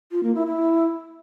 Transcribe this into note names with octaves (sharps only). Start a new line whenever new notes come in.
F4
A#3
E4
E4